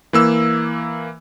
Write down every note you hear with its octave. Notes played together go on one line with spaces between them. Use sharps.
E3 A#3 E6